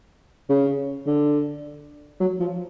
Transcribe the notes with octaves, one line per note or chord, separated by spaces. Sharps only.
C#3
D3
F#3
F3